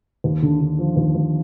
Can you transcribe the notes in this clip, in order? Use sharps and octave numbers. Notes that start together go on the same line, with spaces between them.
D#2
D3
D3
F3
D#2
D#2